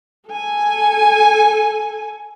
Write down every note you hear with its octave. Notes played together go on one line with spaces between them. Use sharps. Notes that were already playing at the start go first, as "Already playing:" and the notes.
A4 G#5